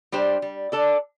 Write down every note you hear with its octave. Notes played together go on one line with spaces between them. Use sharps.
G3 D4 G4 C5
G3
D4 A4 D5